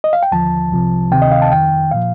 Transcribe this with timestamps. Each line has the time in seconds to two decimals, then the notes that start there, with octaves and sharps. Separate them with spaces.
0.04 D#5
0.13 F5
0.23 G5
0.32 D#2 D3 F3 A5
0.72 C2 C3 F3
1.11 D2 C3 D#3 G5
1.22 D#5
1.31 F5
1.42 A5
1.51 F2 D#3 G5
1.91 A#2 F3 F5